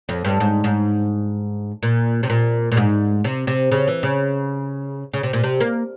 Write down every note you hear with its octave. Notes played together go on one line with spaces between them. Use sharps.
F2
G2
G#2
G#2
A#2
C3
A#2
A#2
G#2
C3
C3
C#3
E3
C#3
C#3
C3
A#2
C3
A#3